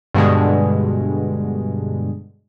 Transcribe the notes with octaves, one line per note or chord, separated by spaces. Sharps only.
G2 B2 D3 G#3